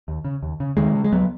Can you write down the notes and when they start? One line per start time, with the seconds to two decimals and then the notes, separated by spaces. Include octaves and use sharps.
0.08 D#2
0.25 C#3
0.43 D#2
0.60 C#3
0.77 D#2 D#3 G#3
0.94 C#3
1.04 G#3
1.12 C#2 F#3 B3